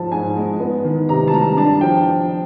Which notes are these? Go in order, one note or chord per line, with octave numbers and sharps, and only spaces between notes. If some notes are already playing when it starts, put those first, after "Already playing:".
Already playing: G#2 F3 A5
G#2 G#5
G#3
B3
D#3
C3 A#5
A5
G3 A#5
D4 A5
F3 G5